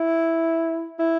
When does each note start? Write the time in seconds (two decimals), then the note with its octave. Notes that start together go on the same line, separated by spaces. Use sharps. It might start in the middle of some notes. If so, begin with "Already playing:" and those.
Already playing: E4
0.99 E4